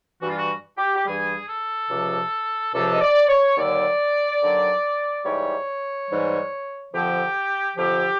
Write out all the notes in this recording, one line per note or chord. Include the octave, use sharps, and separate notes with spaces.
G2 E3 G3 F#4
F4
F#4
G4
G4
G2 E3 G3 G#4
A4
C#2 C3 F3
C#2 C3 F3 A4
D#5
D5
C#5
D#2 D3 F#3 D5
D#2 D3 F#3
G#2 E3 G3 C#5
G#2 E3 G3
F2 D3 F3 G4
F2 D3 F3 G4